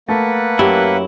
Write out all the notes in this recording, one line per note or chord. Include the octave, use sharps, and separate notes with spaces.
A3 A#3 B4 F#5
F#2 F#3 E4 G4